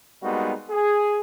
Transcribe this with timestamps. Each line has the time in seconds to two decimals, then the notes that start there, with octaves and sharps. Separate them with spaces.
0.23 G3 G#3 A#3 B3 D#4 F#4
0.71 G#4